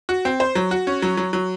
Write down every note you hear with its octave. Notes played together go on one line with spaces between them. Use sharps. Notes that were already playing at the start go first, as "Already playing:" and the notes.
F#4
C4
C5
F#3
F#4
C#4
F#3
F#3
F#3